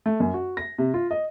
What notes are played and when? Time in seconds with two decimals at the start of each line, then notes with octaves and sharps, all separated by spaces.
0.06 A3
0.20 F#2
0.34 F#4
0.57 A#6
0.78 C3
0.94 F4
1.11 D#5